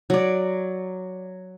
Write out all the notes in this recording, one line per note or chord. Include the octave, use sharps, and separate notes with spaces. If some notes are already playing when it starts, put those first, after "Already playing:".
F#3 D5